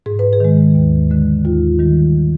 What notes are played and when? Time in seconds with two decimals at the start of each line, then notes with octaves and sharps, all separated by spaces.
0.06 G#2 G#4
0.19 B4
0.33 G#4
0.40 D#3 G#3
0.75 D#2
1.11 D3 G#3
1.45 D#2 F4
1.79 D#3 G3